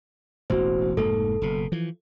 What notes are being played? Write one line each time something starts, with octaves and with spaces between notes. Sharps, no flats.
E1 A1 F#4 C5
F1 G#2 A#3 A4
F#1 B2
E3 F3